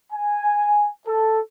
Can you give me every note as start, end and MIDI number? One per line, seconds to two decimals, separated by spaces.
0.13 0.88 80
1.07 1.40 69